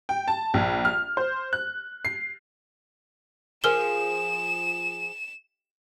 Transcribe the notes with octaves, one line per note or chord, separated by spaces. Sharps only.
G5
A5
A#1
F6
C5
F#6
C7
F3 G#4 A#4 F6 E7 G7